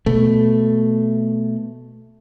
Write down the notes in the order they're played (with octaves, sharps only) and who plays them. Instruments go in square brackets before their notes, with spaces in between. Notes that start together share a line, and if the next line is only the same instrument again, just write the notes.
[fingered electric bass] B2 A3